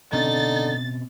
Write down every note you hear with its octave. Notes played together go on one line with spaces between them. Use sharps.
B2 D3 C4 C#4 D#4 A6